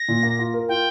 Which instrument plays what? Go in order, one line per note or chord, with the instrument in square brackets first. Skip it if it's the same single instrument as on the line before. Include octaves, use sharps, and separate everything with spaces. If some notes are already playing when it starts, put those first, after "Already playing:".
Already playing: [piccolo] A#6
[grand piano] A#2
A#3
F4
A#4
[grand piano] F4 [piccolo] G5